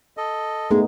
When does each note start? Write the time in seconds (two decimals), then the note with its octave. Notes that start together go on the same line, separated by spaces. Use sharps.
0.17 A4 D#5
0.71 G2 G#3 A3 B3 D#4